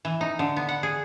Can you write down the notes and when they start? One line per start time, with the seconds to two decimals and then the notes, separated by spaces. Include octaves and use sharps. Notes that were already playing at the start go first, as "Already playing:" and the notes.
0.05 E3
0.21 D#4
0.39 D3
0.56 B3
0.69 F#5
0.83 G#4